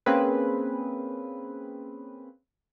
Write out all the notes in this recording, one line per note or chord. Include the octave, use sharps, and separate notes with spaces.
A#3 C4 C#4 G#4 B4